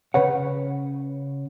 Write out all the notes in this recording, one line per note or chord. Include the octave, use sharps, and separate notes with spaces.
C#3 B4 C#5 F#5